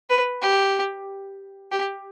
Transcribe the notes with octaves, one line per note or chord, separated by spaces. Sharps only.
B4
G4
G4